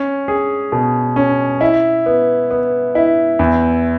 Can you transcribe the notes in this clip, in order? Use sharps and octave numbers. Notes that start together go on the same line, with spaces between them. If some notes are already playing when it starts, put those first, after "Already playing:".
Already playing: C#4
G#4
B2
C#4
E4
B3
B3
E4
E2